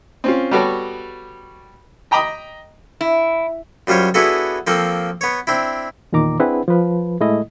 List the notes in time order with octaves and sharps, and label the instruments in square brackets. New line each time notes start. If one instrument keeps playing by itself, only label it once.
[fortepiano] C4 C#4 F4
G3 B3 F#4 G4 A4 C#5
D#5 G5 A#5 B5 D6 D#6
[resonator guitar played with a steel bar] E4
[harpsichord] F#2 G3 F4 C5 C#5
B3 D4 E4 F#4 G#4 A4
F3 A#3 C4 A4
B3 C#5
C4 D4 E4
[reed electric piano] E2 A#2 D#3 A#5 D6
C4 D4 E4 G#4 B4 F#5
F3 B4
A2 G#3 A3 E4 D#5